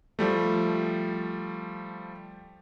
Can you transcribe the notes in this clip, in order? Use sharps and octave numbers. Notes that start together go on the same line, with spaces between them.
F3 G3 A3